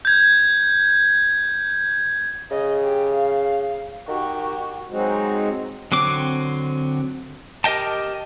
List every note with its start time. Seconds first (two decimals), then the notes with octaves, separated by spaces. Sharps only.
0.05 G6 G#6
2.51 C#3 D#5
2.83 G4
3.15 F5
4.08 D#3 F#4 G4
4.90 F#3 G#3 C4 D#4 F#4
5.92 D3 F#3 C4 D6
7.64 G4 A#4 D#5 G5 A5